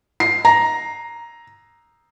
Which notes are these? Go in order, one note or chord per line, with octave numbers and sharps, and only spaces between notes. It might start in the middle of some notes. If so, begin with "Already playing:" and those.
C7
A#5